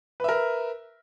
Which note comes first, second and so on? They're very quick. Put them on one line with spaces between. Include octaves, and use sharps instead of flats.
B4 E5 A#4